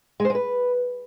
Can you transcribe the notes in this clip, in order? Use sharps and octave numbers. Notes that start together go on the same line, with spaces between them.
G#3
C5
G#3
B4